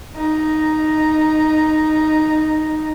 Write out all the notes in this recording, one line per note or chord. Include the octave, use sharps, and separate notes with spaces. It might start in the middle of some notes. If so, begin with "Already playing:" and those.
D#4 A#5